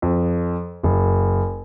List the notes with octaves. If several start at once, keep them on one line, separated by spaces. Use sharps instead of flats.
F2
F#1